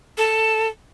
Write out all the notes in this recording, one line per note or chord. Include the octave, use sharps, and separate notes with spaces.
A4